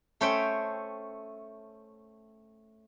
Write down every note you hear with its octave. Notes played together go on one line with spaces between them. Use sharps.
A3 C#4 C5 C#5 E5 G5